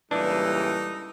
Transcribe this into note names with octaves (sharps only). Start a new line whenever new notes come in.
C#2 A#2 E3 G3 D4 D#4 A4